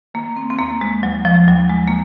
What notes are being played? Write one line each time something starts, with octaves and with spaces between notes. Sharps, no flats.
D#3 A#3
C4
C4
D#2 A#3
G#3
D#2 F#3
F3
D#2 F#3
G#3
A#3